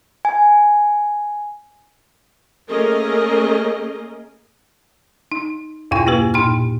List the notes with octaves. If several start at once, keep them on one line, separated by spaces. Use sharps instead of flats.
G#5
A3 A#3 C#4 G#4 A#4 D#5
D#4
E2 G2 B2 E4 G5
A#3 E4 G4 B4
A#2 D#4 G5 C6 F6